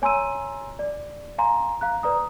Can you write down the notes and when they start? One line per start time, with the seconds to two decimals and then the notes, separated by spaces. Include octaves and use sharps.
0.02 C#5 G#5 A#5 C6 E6 D#7
0.79 D5
1.38 F5 G#5 A#5 C6
1.81 F5 A#5 F#6
2.03 B4 D5 A#5 D#6